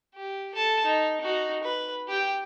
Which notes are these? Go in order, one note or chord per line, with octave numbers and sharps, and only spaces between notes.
G4
A4 A5
D#4
D#4 F#4
B4
G4 G5